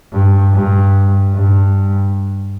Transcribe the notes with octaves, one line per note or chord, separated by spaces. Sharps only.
G2
G2
G2